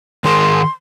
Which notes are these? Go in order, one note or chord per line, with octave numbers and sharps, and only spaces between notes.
D#3 G#4 A#4 C6